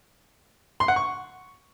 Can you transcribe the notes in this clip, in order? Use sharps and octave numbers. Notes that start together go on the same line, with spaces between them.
C6
F#5
C#6